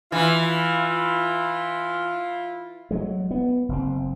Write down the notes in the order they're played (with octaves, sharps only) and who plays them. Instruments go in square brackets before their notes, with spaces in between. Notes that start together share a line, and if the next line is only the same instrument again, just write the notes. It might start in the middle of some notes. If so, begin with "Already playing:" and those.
[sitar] E3 [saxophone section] E4 F4
[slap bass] F#3 G#3
B3
F#1 C4